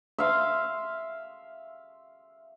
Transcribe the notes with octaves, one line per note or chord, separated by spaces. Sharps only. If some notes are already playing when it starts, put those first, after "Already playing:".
E5 F5 C6